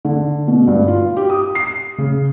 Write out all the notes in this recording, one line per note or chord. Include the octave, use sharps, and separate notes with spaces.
D3
B2
G2
F4
G4
D#6
C7
C#3